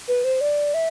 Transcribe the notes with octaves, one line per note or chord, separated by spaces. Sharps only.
B4
C5
D5
E5